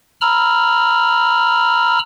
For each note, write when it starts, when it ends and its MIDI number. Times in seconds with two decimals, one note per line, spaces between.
0.21 1.99 82
0.21 1.99 83
0.21 1.99 88
0.21 1.99 89